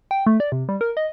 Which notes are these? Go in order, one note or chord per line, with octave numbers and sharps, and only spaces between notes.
G5
A3
D5
C3
G3
A#4
D#5